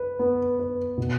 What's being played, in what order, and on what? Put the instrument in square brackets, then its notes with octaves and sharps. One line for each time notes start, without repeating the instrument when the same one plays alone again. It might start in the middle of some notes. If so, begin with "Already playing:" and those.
Already playing: [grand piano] B4
B3
B4
B2